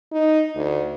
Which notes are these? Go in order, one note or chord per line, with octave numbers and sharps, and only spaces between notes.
D#4
D2